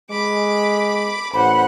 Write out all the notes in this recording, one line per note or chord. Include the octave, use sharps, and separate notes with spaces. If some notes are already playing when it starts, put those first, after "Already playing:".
G#3 B5 D6
A1 C5 F#5 B5